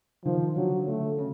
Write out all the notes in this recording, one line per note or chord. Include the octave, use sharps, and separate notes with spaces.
D#3 F3
D3 F#3
D3 A3
C#3